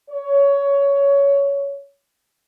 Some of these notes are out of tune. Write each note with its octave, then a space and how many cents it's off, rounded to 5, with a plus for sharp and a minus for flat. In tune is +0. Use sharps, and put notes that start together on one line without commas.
C#5 +15